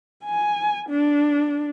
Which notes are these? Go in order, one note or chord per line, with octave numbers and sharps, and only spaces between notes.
G#5
D4